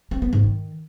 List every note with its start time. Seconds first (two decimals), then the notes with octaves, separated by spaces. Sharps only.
0.11 C4
0.22 B3
0.33 G#2
0.43 D#3